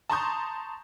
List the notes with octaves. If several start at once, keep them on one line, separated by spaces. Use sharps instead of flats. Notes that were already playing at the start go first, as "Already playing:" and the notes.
A5 A#5 C6 C#6 D#6 G6